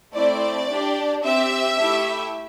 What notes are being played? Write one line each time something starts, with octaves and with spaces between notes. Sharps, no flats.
A3 C4 E4 D5
D4 G4
C4 G4 E5
A3 E4 G4